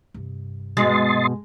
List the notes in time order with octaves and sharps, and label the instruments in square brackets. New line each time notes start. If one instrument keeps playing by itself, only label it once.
[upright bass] G2 C3
[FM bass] B2 [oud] G#3 [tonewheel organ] D#5 C6 A6